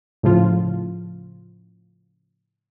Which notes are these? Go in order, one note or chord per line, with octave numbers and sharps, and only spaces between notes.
A2 C#3 F3 F4